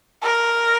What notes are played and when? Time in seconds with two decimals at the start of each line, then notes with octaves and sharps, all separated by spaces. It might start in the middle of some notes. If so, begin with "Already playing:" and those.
0.23 A#4